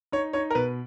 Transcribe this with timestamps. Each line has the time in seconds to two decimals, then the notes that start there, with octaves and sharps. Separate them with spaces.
0.12 D#4 C#5
0.33 D#4 C#5
0.50 A#4
0.55 B2 B4